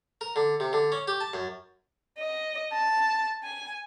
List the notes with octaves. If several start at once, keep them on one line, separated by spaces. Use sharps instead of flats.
A#4
D3
C3
D3
C#4
G4
A5
F#2
D#5
A5
G#5